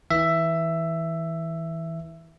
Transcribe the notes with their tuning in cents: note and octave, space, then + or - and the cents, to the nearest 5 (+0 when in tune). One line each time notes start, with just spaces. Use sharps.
E3 -25 E5 +10